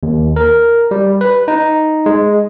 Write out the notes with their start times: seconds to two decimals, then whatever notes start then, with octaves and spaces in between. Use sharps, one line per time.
0.03 D#2
0.36 A#4
0.91 G3
1.21 B4
1.48 D#4
2.06 G#3